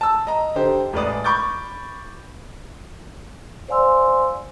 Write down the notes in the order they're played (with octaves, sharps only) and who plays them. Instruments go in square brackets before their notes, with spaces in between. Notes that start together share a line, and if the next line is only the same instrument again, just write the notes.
[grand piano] A5 E6
D#5 A#5
D3 G4 C5
A1 G#3 B4 D5 D#6
B5 C#6 D6 G6 A6
[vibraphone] C5 D5 F5 G#5 C6 E6